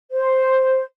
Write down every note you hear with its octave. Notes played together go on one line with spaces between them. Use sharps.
C5